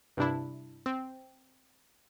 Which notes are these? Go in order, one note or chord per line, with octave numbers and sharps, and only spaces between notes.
G2 C3 D4 E4
C4